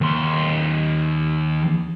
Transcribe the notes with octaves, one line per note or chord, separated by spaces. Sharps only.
D#2 C6